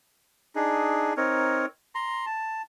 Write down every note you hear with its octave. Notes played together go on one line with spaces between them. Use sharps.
D4 D#4 G#4
C4 D#4 A#4 C#5
A#5 C6
A5